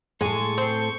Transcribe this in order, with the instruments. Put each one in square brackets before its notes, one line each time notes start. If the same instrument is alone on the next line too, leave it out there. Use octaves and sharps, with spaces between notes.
[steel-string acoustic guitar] A2 A4 [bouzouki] G#3 G#5 [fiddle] C#6
[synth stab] C4 [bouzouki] C5